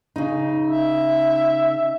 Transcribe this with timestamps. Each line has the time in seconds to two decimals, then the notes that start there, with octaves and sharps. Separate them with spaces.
0.16 C#3 D#4
0.65 E5